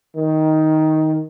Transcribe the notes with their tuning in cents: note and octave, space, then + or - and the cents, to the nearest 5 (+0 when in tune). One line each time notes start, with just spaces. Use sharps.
D#3 +10